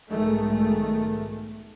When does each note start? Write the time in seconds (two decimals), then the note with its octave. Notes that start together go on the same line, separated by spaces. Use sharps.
0.11 B1 G#2 D#3 G#3 A3